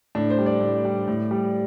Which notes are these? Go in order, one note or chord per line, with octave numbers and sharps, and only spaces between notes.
A2 D4
C5
G3
D5
A2
G3
A2
G3